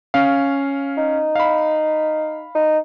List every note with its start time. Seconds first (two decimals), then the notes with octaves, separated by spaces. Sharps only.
0.14 C#4 F5
0.97 D#4
1.35 F5 B5
2.55 D#4